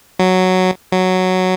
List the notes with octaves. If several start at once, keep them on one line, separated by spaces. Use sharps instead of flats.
F#3
F#3